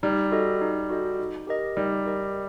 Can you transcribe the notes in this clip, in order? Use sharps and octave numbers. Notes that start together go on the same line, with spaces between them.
G3 D#4
F#4 A4 D#5
D#4
F#4 A4 D#5
D#4
G4 A#4 D#5
G3 D#4
G4 A#4 D#5